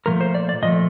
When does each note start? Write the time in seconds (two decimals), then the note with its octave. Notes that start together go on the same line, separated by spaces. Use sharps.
0.06 A#2 F3 A3 A#4
0.21 C5
0.35 D5
0.49 D5
0.62 A#2 F3 A3 D#5